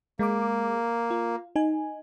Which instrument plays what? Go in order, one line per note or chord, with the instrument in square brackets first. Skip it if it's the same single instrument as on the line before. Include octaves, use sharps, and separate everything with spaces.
[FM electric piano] G#3 D6 [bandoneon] A#3
[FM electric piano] F4
D#4 G#5